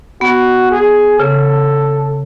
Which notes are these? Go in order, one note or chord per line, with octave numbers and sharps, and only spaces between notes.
B3 F#4
G#4
C#3 A4